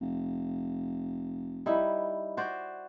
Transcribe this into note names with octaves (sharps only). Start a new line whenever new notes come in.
F1
G3 D#4 E4
F#4 C5 D5